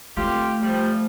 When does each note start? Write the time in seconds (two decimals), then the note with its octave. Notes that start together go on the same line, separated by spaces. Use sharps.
0.17 A3 C4 F4 G4
0.62 F3 G3